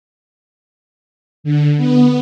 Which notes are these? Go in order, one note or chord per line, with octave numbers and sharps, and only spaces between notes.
D3
B3